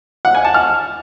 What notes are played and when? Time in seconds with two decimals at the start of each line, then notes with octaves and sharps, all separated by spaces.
0.25 F#5
0.35 G#5
0.45 A5
0.54 F6